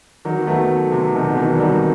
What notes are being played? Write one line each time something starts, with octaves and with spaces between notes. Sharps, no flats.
D#3 F#3
B3
F#3 A3
C3
B2 D#3
D#3
C3 E3
G3
D#3 F#3